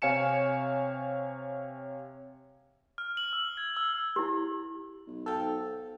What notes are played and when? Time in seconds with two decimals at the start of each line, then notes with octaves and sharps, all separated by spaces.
0.02 C3 C#5 F5 G#5 C#7 E7
2.98 F6
3.17 F#7
3.33 E6
3.57 G#6
3.77 E6
4.16 E4 G4
5.07 B1
5.26 G#2 A4 F5 G5